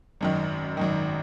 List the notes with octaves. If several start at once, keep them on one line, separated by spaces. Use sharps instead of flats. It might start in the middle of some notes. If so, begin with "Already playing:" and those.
G#1 F#2 D#3
G#1 F#2 D#3